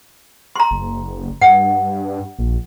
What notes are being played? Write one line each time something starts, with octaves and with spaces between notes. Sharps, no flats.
A#5 C6
F#1
G2 F#5
A#1